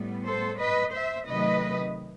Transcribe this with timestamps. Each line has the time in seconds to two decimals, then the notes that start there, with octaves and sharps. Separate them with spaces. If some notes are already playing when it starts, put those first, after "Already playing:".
Already playing: A2 G3 B3
0.25 A4 C5
0.59 B4 D#5
0.93 C5 E5
1.26 C3 D#3 F#3 A3 B4 D#5